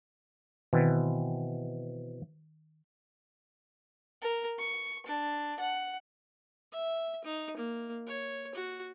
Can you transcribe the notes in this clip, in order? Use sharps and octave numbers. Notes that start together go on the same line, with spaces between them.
B2 D#3 E3 C4
A#4
C#6
D4
F#5
E5
D#4
A#3
C#5
F#4